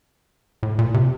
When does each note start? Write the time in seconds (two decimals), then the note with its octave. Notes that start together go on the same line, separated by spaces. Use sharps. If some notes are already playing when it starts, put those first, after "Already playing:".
0.63 A2
0.79 A#2
0.94 C3